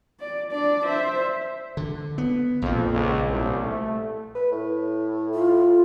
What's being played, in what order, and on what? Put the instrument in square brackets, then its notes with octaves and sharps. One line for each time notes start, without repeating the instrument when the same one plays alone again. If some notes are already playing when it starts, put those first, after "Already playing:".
[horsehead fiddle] D5
D4 D5
C5 E5
[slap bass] D3
B3
[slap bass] A#1 A#2 [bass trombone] F2
[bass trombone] C#2
C2
A3
[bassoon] B4
A2
[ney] F4